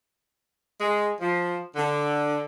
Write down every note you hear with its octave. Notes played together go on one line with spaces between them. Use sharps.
G#3
F3
D3